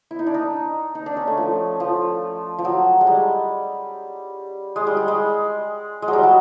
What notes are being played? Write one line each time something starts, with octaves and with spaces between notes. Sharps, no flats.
E4
D#4
D4
D#4
D#4
D4
C#4
A3
F3
F3
F3
F#3
G#3
G3
G#3
G3
G3
G#3
G#3
F#3
G3
F#3